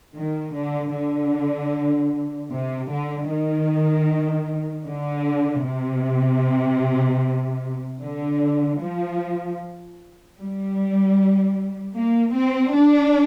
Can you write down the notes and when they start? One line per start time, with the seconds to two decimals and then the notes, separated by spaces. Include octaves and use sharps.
0.15 D#3
0.54 D3
0.94 D3
2.51 C3
2.91 D3
3.30 D#3
4.87 D3
5.65 C3
8.01 D3
8.80 F3
10.39 G3
11.95 A#3
12.35 C4
12.74 D4